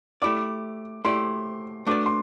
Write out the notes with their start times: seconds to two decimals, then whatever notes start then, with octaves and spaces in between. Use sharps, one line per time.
0.22 A3 E4 G4 D5 D6
1.05 A3 E4 G4 D5 C6
1.87 A3 D4 F#4 B4 D5 D6
2.06 C6